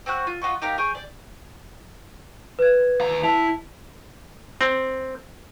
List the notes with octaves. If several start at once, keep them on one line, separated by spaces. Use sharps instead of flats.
C4 C#4 F#4 F#6
F4
F4 F#4 D#5 C#6
D#4 G4 A#4 F5
G#4 C#5 G5
D5
B4 G#6
D#2 A#5
E4 A5 F7
C4